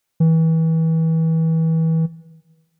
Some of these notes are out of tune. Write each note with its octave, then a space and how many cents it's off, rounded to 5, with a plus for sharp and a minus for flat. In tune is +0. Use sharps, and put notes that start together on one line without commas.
E3 -30